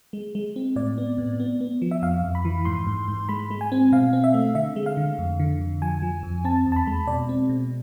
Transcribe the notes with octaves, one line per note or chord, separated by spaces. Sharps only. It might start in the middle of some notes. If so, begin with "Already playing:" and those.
G#3
G#3
C4
A2 D5
B3
A2
B3
B3
F3
E5
F2 F5
F2
B5
E3
G#2 C6
G#2
G#2
G#3 B5
G#3
G#5
C4
B2 F5
C4
E5
A3
D3 E5
G#3
F5
D3
F2
D3
F2
F3 G#5
F3
F2
C4 A5
E2
A5
B5
G#3
B2 D5
C4
B2